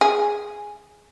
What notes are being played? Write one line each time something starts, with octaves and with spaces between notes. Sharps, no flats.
G#4